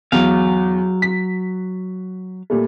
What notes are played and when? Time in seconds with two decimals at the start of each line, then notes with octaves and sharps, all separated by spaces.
0.12 E2 F#3 F5
1.02 B6
2.50 A#2 G3 A3